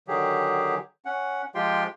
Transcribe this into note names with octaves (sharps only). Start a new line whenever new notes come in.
D3 D#3 F#3 G4 G#4
C#4 F#5
F3 G#3 F4 G4 G5 C6